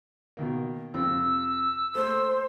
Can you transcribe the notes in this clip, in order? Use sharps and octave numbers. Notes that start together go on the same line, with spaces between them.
B2 D#3 A#3
F2 C3 E6
A3 C5